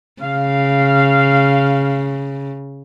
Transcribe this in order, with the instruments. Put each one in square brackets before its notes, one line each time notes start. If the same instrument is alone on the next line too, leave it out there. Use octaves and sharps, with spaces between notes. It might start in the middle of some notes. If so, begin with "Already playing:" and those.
[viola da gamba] C#3 [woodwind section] F5